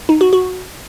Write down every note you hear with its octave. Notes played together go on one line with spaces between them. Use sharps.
D#4
F#4
F#4